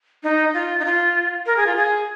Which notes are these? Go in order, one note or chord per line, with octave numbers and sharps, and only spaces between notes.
D#4
F4
D#4
F4
A#4
G#4
F4
G#4